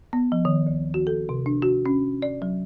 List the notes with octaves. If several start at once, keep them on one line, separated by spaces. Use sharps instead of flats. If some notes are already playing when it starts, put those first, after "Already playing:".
B3
F3
D#3
D2
F#4
A4
C3
D4
F#4
C#4
D5
F#3